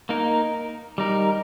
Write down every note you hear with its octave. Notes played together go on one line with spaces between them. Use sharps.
A#3 D#4 A#4
G3 D#4 A#4